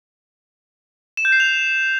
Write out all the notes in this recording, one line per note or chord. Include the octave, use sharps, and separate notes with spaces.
E7
G6
C7
F7